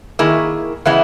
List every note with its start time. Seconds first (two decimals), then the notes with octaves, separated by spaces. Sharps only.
0.19 D#3 A#3 E4 G#4
0.85 C#3 E3 G#3 B3 E4